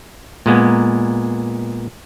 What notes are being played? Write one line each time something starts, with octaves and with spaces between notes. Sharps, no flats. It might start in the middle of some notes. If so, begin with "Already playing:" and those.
A#2 G#3 B3